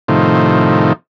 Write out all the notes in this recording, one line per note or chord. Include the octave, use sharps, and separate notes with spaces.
A2 C3 D#3 F3